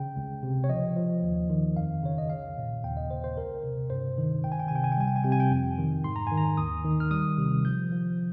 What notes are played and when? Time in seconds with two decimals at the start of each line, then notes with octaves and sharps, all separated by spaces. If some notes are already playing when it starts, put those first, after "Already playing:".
Already playing: C#3 G5
0.16 C#2
0.43 C3
0.64 C#5
0.69 F3 D#5
0.96 F3
1.23 D#2
1.50 D#3
1.77 F2 F5
2.03 C#3 C#5
2.18 D#5
2.30 C2 F5
2.57 A#2
2.84 D#2 G5
2.97 D#5
3.10 C#3 C5
3.24 C5
3.37 C2 A#4
3.63 C3
3.90 G2 C5
4.18 D#3
4.44 C#2 G5
4.52 G#5
4.60 G5
4.68 C3 G#5
4.75 G5
4.84 G#5
4.92 G5
4.97 G3 G#5
5.07 G5
5.16 G#5
5.24 C3 G5
5.32 G#5
5.40 G5
5.51 F2
5.78 D#3
6.04 G#2 C6
6.16 A#5
6.27 D#3 G#5
6.38 A#5
6.57 D#2 D#6
6.85 D#3
7.00 F6
7.11 G3 D#6
7.38 C3
7.65 F3 G6
7.92 F3